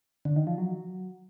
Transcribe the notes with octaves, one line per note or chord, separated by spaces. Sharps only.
D3
D#3
F3
F#3